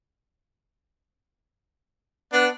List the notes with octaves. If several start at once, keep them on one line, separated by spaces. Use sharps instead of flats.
B3 D4